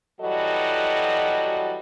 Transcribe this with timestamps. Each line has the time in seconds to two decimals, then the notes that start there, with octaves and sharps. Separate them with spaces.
0.21 E3 F#3 G3 F#4 A4 D#5